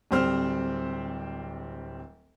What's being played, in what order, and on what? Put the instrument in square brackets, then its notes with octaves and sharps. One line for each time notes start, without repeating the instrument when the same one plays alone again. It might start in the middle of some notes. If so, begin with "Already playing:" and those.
[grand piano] D1 G3 C4 C5 F6